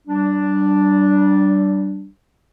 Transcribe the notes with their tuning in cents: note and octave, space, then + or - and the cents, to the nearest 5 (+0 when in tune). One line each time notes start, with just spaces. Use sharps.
G3 -35 D4 +0